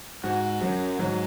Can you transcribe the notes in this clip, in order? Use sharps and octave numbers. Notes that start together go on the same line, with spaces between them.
G#2 F#4
F#2 F#3
G#2 F#3